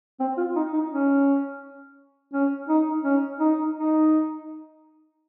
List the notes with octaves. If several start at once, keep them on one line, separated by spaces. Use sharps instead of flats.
C4
F4
D#4
D#4
C#4
C#4
D#4
C#4
D#4
D#4